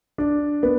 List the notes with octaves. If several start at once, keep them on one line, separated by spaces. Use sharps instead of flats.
D4
B3